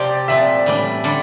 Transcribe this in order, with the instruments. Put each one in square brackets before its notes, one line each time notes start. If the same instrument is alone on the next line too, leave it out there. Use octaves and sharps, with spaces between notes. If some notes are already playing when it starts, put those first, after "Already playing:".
Already playing: [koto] C3 F3 C4 G4 [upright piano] D5
[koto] A#2 F3 C4 [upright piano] E5
[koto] A2 E3 G3 D4
D3 G3 D4 A4